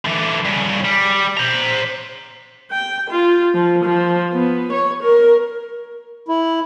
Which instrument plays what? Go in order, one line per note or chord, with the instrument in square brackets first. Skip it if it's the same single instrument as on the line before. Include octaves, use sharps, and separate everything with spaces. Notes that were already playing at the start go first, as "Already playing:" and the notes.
[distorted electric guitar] D3 E3
G2 C#3
G3
C5 A#5
[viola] G5
F4
F3
F3
B3
C#5
A#4
[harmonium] E4